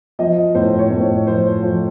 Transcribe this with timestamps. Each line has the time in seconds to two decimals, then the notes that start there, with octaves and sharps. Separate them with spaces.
0.19 F3 D#5
0.55 A2 C5
0.79 C#5
0.90 A2 C5
1.27 F3 C5
1.63 F3